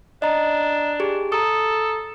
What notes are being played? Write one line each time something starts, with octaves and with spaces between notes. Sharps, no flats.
D4 D#5 A#5
G4 G#4
A4 A#5 D#6